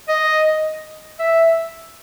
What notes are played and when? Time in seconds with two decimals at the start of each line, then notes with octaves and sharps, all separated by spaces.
0.09 D#5
1.19 E5